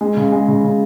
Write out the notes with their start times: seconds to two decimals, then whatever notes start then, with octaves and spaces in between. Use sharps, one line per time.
0.01 G#3
0.17 C#3
0.32 G#3
0.48 C#3
0.64 C#3